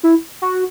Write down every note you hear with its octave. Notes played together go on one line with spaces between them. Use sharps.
E4
F#4